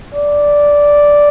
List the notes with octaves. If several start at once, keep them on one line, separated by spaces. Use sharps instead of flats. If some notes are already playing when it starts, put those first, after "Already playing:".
D5